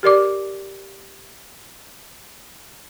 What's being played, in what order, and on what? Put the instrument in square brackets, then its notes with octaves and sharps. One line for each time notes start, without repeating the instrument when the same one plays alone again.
[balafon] G4 A#4 D5 D6